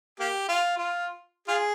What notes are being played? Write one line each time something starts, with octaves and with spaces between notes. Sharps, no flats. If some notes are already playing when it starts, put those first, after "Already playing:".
A#3 G4
F4
F4
F4 G#4